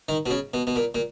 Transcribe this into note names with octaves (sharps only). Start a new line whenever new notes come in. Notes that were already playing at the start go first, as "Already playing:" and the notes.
D#3
B2
C#3
B2
B2
A#2
A#2